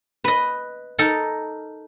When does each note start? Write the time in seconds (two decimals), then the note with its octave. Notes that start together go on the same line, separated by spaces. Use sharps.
0.24 B4 D#5
0.99 D#4 A4 A#4